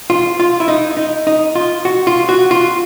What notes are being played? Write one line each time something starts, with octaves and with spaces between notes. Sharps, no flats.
F4
F4
E4
D#4
D#4
D#4
F4
F#4
F4
F#4
F4